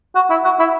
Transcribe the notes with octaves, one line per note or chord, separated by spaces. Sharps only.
F#4
E4
F#4
E4